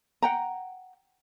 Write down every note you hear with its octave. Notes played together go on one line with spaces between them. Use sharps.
F#5 G5 A#5